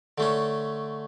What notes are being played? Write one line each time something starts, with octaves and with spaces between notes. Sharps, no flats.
D3 A3 C#4